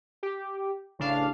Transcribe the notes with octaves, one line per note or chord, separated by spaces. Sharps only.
G4
A1 C#3 D4 F5